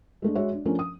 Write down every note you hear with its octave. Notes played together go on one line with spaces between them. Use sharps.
G#3 A3 D4
G#3 F#4 C#5 E5
D4
F3 A3 C#4 D4 A#4
D#6